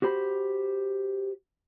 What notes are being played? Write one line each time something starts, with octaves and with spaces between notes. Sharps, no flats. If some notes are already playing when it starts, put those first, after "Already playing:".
F#4 G4 C5 B5